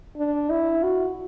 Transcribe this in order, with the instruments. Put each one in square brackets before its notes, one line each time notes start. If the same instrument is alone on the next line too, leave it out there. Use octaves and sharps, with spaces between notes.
[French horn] D4
E4
F#4